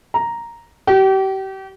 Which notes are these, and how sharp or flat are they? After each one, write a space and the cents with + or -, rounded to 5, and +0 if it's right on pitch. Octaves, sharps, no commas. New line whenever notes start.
A#5 +0
G4 -35